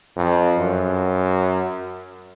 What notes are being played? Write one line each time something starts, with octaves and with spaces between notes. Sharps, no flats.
F2
F#2